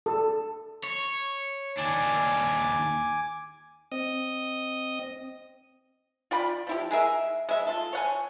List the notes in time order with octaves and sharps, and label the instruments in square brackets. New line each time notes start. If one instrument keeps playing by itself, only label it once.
[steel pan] A4
[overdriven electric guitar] C#5
[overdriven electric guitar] D#2 D4 [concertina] G#5 D6
[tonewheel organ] C4 D#5 D#6
[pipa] F4 D5 G5 B5
F3 E4 G4
G#3 G#4 A#4 E5
G#3 E5
F4 A4
C#5 F#5 G#5